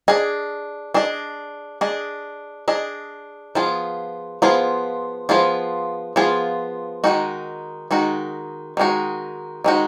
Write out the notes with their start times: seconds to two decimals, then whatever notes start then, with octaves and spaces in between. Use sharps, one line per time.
0.08 D4 G#4 D#5
0.94 D4 G#4 D#5
1.81 D4 G#4 D#5
2.68 D4 G#4 D#5
3.55 F3 B3 F4 G#4
4.42 F3 B3 F4 G#4
5.29 F3 B3 F4 G#4
6.16 F3 B3 F4 G#4
7.04 D#3 G#3 D#4 F#4
7.91 D#3 G#3 D#4 F#4
8.77 D#3 G#3 D#4 F#4
9.64 D#3 G#3 D#4 F#4